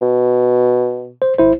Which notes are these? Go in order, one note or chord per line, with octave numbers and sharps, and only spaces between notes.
B2
C5
G#1 E4 C5